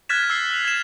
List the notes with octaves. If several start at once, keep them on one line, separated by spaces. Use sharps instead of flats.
F6 F#6 G#6 A6 B6 E7
E6 C7
F#6 F7
G#6 E7